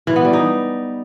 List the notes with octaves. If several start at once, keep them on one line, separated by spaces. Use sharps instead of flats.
E3
B3
G3
D#4